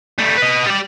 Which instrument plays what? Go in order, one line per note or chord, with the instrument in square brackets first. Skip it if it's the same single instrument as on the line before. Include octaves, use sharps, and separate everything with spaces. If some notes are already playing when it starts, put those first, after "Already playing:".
[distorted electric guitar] G3 A3
B4 D#5
G3 D5